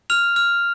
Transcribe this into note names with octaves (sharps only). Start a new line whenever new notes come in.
F6 F7
F6